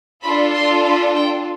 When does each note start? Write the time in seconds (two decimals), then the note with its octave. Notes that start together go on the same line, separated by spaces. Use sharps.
0.22 D4 F4 A4 B5
0.54 C6
0.85 B5
1.15 G5